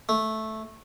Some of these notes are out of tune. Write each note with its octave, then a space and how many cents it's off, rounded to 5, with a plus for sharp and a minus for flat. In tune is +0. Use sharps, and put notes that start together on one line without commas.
A3 -5